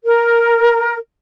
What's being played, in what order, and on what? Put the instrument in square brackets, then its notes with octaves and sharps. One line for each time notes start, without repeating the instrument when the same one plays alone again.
[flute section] A#4